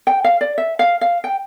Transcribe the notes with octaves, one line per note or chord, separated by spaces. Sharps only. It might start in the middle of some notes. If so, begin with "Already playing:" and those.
G5
F5
D5
E5
F5
F5
G5